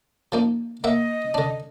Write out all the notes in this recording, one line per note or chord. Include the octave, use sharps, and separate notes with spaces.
F3 A#3 D#4
A#3 D#5 E5 F#5
D3 D4